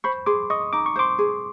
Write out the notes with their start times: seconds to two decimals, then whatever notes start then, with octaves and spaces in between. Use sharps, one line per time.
0.04 C5 B5 C#6
0.26 G#4 C6 D6
0.50 D#5 C#6 D#6
0.73 D#4 D6
0.86 C#6
0.96 C5 C6 D6
1.18 G#4